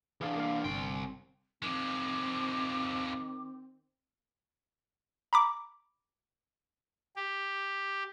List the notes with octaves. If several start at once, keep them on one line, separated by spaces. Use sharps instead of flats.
E3 D4 G#4 F5
A#3 F5
G1 C2 G5 C6
D#3 F3 G#3 C4 D6
A#5 B5 D6
G4